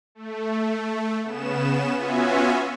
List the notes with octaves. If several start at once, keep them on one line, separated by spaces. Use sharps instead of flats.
A3
C#3 B3 E7
B3 C#4 F4 F#4 E5 G#5